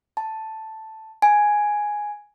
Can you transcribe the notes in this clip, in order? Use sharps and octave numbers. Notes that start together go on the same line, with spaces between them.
A5
G#5